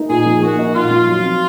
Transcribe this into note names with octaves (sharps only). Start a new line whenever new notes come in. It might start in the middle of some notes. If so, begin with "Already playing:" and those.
Already playing: A#3 D#4
A#2 G#4
F3
A#3 F#4
D#4
A#2 F4
F3
F#3
C4